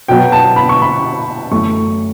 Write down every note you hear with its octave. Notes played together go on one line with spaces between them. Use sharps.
B2 F#3 B3 G5
A5
B5
C#6
B5
F#2 E3 A3 C#6